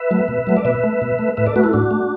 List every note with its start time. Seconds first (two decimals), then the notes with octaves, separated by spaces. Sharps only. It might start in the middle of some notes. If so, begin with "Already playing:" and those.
Already playing: B4 E5
0.11 F#3 A3
0.28 B2
0.47 F#3 A3
0.57 D5
0.65 B2 B4 E5
0.84 A3
1.02 B2
1.19 A3
1.37 A2 B4 E5
1.46 A4 D5
1.56 A3 F#4 B4
1.64 E4 A4
1.73 A2 D4 F#4
1.91 A3